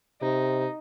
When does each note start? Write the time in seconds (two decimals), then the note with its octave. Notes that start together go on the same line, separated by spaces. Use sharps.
0.22 C3 D#4